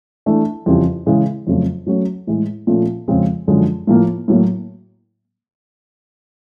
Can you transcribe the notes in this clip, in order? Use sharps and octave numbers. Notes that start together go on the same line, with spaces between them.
E3 A3 D4
F2 C#3 E3 G3
C#3 E3 G#3
F2 C#3 F#3 A3
F#3 A3 C#4 F#4
A2 E3 G#3
A#2 F3 A3 C#4
F2 C#3 F3 G#3 C4
F#2 D3 F3 G#3 C#4
A2 F3 A#3
A2 F#3 A#3